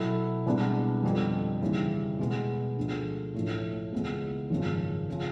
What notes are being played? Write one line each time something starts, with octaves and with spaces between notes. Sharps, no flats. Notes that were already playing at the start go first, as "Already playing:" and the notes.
Already playing: B2 F#3 B3 E4 A4
C2 B2 G#3 B3 D4
F2 D3 G3
D#2 C#3 E3 G3
B2 G#3 B3
D2 D3 F3 G#3
A1 A2 F3 A3
C#2 C#3 E3 G#3 B3
G#1 F#2 C#3 F3
C#3 F3